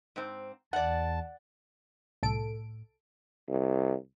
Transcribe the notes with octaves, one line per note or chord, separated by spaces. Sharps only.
G#2 C4
E2 D5 F#5 A5
C2 A2 A4 D7
C2